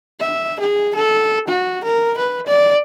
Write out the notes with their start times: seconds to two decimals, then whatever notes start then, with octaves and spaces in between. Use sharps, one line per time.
0.20 E5
0.60 G#4
0.95 A4
1.48 F#4
1.84 A#4
2.18 B4
2.47 D5